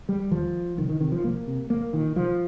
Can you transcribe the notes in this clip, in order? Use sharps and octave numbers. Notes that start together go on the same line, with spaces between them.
G3
D#2 F3
C2 D#3
D#3
C3 D#3
F3
C2 A#3
C3
C2 A#3
A#2 D#3
C2 F3